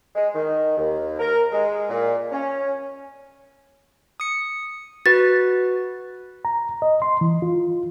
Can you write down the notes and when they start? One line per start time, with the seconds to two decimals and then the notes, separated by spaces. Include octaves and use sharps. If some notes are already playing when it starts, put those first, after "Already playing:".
0.15 G#3
0.34 D#3
0.77 D#2
1.18 A#4
1.52 G#3
1.89 A#2
2.31 C#4
4.20 D#6 C#7
5.06 F#4 B4 A6
6.45 A#5
6.82 D#5
7.02 C6
7.21 E3
7.42 F4